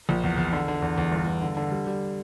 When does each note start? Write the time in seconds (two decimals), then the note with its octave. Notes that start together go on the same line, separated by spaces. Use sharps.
0.09 A#1
0.24 E2
0.37 E2
0.53 D3
0.68 D3
0.82 E2
0.98 E2
1.12 G1
1.27 G1
1.42 D3
1.57 D3
1.71 G3
1.87 G3